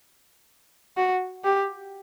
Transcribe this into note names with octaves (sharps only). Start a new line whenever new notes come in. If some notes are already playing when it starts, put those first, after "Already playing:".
F#4
G4